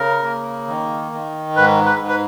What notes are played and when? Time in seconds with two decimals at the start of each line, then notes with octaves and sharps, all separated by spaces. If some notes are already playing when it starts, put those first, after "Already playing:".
Already playing: C#3 A#4
0.23 A#3
0.68 D#3
1.12 D#3
1.56 G#2 B4
1.86 B4
2.00 G#2
2.08 B4